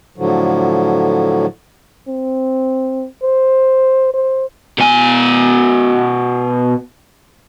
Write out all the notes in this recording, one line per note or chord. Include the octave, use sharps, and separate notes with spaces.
A2 D3 F3 F#3
C4
C5
C5
B2 G#5